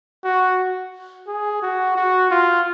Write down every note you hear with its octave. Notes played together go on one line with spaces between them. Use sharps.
F#4
G#4
F#4
F#4
F4